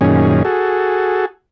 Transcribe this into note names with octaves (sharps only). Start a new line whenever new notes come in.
F#2 A#2 D#3 C#4 G#4
F#4 G#4 A4